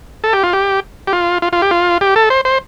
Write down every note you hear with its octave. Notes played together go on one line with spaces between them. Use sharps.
A4
G4
F4
G4
G4
F4
F4
F4
G4
F4
G4
A4
C5
C5